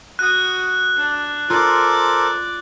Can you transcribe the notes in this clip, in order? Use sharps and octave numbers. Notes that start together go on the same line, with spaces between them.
F#4 D#6 F#6
D4
F4 A4 A#4 C5 D5 D6